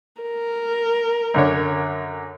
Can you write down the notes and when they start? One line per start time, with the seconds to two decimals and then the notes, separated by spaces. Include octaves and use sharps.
0.22 A#4
1.34 F#2 D3 C#5